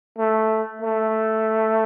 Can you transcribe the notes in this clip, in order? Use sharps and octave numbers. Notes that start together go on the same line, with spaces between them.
A3
A3